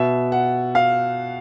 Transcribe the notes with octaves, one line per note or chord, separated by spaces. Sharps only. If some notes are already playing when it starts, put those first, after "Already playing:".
Already playing: B2 E5
F#5
F5